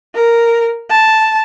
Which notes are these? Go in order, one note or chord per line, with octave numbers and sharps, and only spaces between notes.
A#4
A5